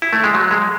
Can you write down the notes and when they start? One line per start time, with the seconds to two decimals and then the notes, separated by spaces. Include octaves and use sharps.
0.02 E4
0.13 A3
0.24 G#3
0.34 F#3
0.51 G#3